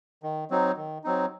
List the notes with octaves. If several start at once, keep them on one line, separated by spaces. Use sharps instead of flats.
D#3
F#3 C4 D#4
D#3
F#3 C4 D#4